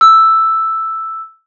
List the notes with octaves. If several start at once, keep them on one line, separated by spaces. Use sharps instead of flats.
E6